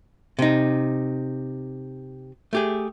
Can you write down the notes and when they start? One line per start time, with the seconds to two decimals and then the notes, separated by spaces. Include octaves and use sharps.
0.39 C3 D#4
2.53 A3 G4 G#4